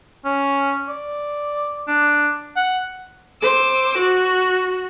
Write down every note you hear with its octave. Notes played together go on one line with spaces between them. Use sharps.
C#4
D5
D4
F#5
C5 D6 E6
F#4